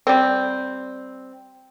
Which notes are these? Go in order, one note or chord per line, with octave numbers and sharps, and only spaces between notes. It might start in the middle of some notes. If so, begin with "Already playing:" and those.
G3 C4